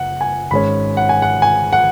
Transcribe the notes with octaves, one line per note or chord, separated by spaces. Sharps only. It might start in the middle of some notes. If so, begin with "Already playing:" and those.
Already playing: F#1 F#5
G#5
G#1 G#2 G#3 C#4 B5
F#5
G#5
F#5
G#5
F#5